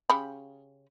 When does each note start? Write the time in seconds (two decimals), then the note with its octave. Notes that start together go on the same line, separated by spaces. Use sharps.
0.10 C#3 G4 B5